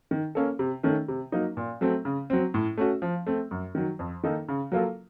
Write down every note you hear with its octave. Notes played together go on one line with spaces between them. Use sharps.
D#3
A#3 C#4 A4
C3
D#3 A3 C#4
C3
F#3 A#3 D#4
A#2
F#3 A3 C4
C#3
F#3 C4
A2
A3 C#4 F#4
F3
A3 C4
F#2
D#3 F#3
F2
D#3 A#3 D#4 A4
C#3
F#3 A#3 F4 A4